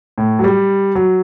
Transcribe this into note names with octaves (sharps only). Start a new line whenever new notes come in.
A2
F#3
G3
F#3